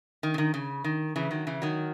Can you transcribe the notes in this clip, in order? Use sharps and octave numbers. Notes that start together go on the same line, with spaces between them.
D#3
C#3
D#3
C#3
D#3
C#3 E3
D#3 F#3
C#3 E3
D#3 F#3